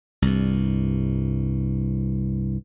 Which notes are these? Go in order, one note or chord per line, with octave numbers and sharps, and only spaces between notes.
C2 G2